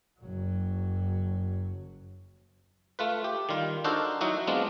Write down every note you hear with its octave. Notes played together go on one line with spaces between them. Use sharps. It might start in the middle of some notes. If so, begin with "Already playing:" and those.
F#1 F#3
A3 F4 B4
G4
D#3 G3 F4
D4 D#4 F#4 A4 A#4 C5
F#3 D#4 E4 F#4
F#3 G#3 B3 C4 D4 F4